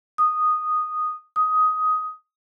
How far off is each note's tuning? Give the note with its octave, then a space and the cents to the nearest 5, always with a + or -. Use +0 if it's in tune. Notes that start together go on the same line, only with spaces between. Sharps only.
D#6 -10
D#6 +10